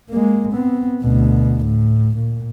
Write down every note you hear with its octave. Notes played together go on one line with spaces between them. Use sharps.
G#3 A#3
B3 C4
D2 B2
A2
A#2